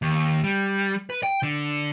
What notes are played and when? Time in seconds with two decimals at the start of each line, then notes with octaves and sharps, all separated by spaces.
0.02 D#2
0.44 G3
1.10 B4
1.23 G5
1.43 D3